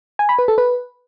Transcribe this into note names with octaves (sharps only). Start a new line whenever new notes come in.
G#5
B5
B4
A4
B4